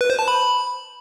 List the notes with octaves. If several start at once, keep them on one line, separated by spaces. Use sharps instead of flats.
B4
C5
A5
B5